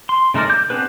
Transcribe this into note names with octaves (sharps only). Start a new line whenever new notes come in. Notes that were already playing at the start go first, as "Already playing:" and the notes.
C6
C#3 A3 D#4 A#4 D5
D6 G6
B3 C4 D4 G#4 B4